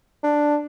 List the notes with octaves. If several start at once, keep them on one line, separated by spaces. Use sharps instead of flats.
D4